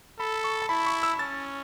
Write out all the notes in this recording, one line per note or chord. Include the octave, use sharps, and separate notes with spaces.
A4 B5
C#6
A5
E4 B5
C#6
E6
C#4 A6